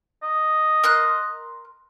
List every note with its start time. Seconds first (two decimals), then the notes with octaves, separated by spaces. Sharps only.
0.23 D#5
0.84 A#4 C6 F#6